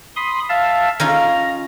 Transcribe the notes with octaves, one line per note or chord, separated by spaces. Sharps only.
B5 C6 D#6
E5 F5 A5
C#4 D#4 F4 A#5